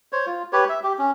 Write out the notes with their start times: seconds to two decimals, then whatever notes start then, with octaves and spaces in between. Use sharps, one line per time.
0.12 C5 C#5
0.26 F4
0.53 G4 B4 C#5
0.69 E5
0.83 G4
0.99 C#4